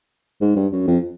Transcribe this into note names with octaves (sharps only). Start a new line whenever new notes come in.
G#2
G2
F#2
F2